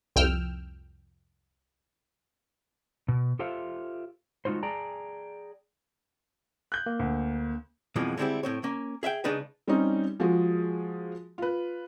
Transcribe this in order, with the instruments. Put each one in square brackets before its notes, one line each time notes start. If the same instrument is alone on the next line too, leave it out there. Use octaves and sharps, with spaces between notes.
[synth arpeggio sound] C2 F2 G5 E6 F6
[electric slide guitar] B2
F4 G4 A4 C5 E5 F5
G#3 D#4 F4 F#4 C5
G#4 D5 G5 A5 A#5
[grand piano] F#6 G6
[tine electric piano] A#3
[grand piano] D2
[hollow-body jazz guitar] F2 B2 E3 F3 G3 G#3
D3 G3 G#3 C4 E4 G4
A2 C4 C#5
A#3 C#4
G#4 E5 F5 G5
C#3 G#3 D4 D#4 B4
[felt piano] G3 C4 C#4 D#4
F3 G#3 F4 F#4 G#4
F4 B4